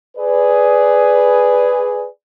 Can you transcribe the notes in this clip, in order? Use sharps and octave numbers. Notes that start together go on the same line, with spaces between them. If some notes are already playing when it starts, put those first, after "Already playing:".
G#4 B4 D5